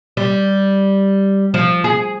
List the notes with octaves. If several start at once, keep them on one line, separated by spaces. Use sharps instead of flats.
G3
F3
G#4